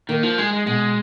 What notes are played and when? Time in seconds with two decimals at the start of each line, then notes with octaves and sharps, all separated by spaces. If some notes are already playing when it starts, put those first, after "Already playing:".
0.09 D#3 A#3
0.23 F3
0.38 G#3 D#4
0.53 G#3
0.66 B2 G#3